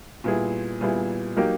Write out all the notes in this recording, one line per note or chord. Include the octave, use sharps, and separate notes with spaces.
A#2 G3 B3 E4 G#4
A#2 G3 B3 E4 G#4
F#3 A#3 D#4 G4 A#4